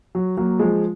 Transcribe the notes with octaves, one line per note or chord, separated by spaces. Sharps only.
F#3
F#3 A#3
F3 G#3